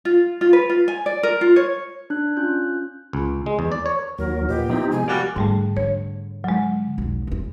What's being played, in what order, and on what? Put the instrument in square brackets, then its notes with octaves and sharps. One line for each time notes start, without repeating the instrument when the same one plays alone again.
[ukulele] F4
F4
B4
F4
G#5
D5
A#4
F4
C#5
[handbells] D4 F#6
C#4 F4 F#6 G6
[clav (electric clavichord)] C#2
G#3
E2
D5
C#5
[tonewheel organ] D#2 F#3 [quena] A#4
[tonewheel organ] A#2 [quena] G4 [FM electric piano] B4 D#5 F#5
[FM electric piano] F3 B3 E4 [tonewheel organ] C4 D#4
[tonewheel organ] C3 G#3 [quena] G#5
[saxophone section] G3 A#3 F#4 [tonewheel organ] A#4 D5
[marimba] G#2 G3 A3 [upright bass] D3
[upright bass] D3 [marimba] C#5
[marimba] F#3 G#3
[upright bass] B1 E2
E2 E4